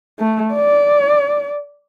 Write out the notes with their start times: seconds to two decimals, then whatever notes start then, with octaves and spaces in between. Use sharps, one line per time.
0.19 A3
0.54 D5